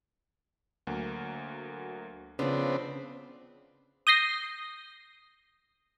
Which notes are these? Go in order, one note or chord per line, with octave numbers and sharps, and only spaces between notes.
D2 F#3 A#3
C#3 F3 B3 C4 D4
D#6 G6 A#6 C7